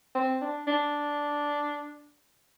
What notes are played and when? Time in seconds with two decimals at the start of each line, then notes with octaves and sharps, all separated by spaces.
0.15 C4
0.42 D4
0.67 D4